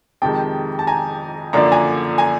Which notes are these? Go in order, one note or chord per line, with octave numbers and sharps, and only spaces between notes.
F2 C3 D#3 G#3 G5 A5
A5
G#5 A#5
F#2 D3 F3 A#3 D4 A#5
G#5 A#5
G#5 A#5